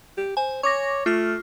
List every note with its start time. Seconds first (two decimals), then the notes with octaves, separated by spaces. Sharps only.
0.18 G4
0.37 C5 G#5
0.63 C#5 C#6 D6 A#6
1.06 A3 F4 F6